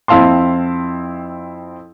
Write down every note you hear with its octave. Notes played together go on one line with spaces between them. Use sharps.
F2 C4 E4 F5 A5 C6